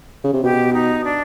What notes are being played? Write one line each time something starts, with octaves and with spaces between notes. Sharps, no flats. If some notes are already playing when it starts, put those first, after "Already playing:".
C#3
C3
B2 G4
D#4
D4